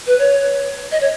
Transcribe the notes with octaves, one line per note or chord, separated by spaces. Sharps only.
B4
C#5
D#5
C#5